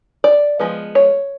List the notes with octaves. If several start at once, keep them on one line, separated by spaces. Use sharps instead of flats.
D5
F3 G#3 B3
C#5